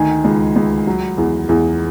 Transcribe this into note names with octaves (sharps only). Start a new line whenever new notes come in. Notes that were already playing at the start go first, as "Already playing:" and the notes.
Already playing: D2 D#3 G#5
C#2
C#2
F#3
E2
E2